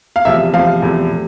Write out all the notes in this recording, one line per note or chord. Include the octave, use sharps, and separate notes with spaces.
F5
E2 C3 F3 A3 E5
E2 C3 F3 A3 F5
E2 C3 F3 A3
C3